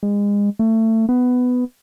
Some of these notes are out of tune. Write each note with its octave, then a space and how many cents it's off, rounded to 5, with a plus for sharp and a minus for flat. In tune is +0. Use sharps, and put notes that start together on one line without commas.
G#3 -30
A3 +25
B3 +10